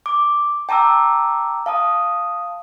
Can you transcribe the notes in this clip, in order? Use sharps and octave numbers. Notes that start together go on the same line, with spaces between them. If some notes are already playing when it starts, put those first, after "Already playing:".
D6
G5 A5 A#5 D6 E6
F5 A5 D#6